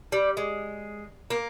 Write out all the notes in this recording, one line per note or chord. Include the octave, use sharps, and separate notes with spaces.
G3
G#3
A#3